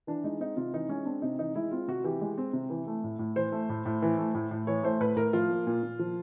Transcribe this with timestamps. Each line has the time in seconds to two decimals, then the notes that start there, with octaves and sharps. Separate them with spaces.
0.07 E3 D4
0.24 G#3 D#4
0.40 C4 D#4
0.57 C3 F4
0.74 E3 D#4
0.89 G#3 C#4
1.05 C4 D4
1.22 C3 D#4
1.39 E3 D#4
1.55 G#3 E4
1.71 C4 F4
1.88 C3 F#4
2.04 E3 G4
2.21 G#3
2.38 C4
2.53 C3
2.70 E3
2.87 A3
3.04 A2
3.19 A2
3.36 E3 C5
3.52 A3
3.69 A2
3.85 A2
4.02 E3
4.18 A3
4.34 A2
4.51 A2
4.67 E3 C#5
4.83 A3 C5
5.00 A2 B4
5.16 A2 A#4
5.33 F3 F4
5.49 A#3
5.67 A#2
5.83 A#2
5.99 F3